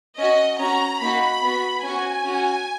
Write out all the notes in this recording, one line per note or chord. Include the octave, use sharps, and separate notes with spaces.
C#4 F#4 D#5
C#4 F#4 A#5
A#3 D#4 F#4 B5
B3 F#4
C#4 F#4 G#5
C#4 F#4